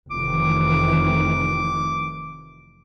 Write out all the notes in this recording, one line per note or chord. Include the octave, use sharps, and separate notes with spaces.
F1 D#3 E3 D6